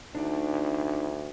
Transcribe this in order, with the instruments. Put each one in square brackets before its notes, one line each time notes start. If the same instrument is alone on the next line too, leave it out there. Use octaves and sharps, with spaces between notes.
[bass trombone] D2 [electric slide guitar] D4 D#4 D5